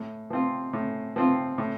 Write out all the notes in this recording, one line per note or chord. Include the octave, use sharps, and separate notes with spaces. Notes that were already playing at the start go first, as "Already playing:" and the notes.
Already playing: A2
F3 C4 F4
A2
F3 C4 F4
A2